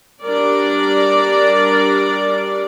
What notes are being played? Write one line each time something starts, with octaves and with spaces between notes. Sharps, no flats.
G3 D4 A#4 D5